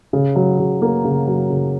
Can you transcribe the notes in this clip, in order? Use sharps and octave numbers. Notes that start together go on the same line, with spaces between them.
C#3
F#3
C#3
A#3
C#3
F#3
C#3